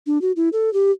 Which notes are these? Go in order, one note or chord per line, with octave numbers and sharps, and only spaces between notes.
D4
F#4
E4
A4
G4